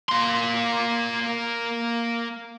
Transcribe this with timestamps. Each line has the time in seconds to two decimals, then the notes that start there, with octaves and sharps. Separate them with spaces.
0.09 A#3 C6